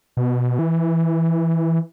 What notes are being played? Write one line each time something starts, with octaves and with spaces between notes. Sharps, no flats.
B2
E3